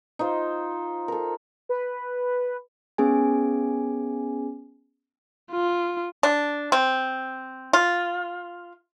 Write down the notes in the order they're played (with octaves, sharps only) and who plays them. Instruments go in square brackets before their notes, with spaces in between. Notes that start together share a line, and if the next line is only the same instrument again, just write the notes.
[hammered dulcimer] D#4 F4 C5
A4 A#4
[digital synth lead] B4
[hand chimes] B3 C#4 G#4 G#5
[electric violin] F4
[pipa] D4
C4
F4